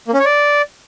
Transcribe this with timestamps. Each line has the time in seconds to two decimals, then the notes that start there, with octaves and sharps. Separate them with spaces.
0.08 A#3
0.14 C#4
0.19 C#5
0.25 D5